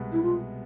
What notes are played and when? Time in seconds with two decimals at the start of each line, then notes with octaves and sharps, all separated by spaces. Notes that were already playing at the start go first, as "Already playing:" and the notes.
Already playing: C2 B2 G#3 B3
0.12 E4
0.23 F4